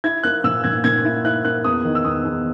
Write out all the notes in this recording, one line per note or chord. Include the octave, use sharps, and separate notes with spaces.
E4 G#6
A#3 F#6
A#2 E6
A#2 G#6
A#2 G#6
E4
E4 F#6
A#3 F#6
E2 D#6
D#3
E6
E2 D#6
E2